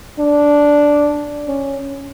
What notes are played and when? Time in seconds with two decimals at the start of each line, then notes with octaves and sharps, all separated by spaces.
0.19 D4
1.48 C#4